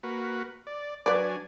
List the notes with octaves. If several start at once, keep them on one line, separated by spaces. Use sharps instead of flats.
A#3 F#4 B4
D5
F#3 D4 B4 D5 G#5